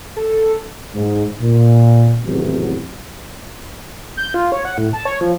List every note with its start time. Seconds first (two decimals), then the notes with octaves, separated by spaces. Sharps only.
0.16 A4
0.95 G#2
1.41 A#2
2.24 G#1 E2 A2 C3 F#3
4.17 G6
4.34 F4
4.52 C#5
4.65 F#5
4.78 A2
4.93 A5
5.05 C#5
5.21 F3